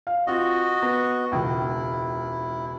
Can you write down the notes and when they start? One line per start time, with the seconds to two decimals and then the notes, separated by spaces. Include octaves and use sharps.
0.07 F5
0.27 C4 F4 F#4 D#5
0.82 B3
1.32 E1 C#2 E4